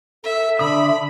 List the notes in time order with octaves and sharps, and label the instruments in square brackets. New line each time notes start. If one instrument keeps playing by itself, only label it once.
[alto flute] A4 [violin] E5
[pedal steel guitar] D3 D#6 [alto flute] E5 [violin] B5